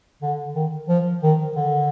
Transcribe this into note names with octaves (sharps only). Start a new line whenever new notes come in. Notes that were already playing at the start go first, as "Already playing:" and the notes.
D3
D#3
F3
D#3
D3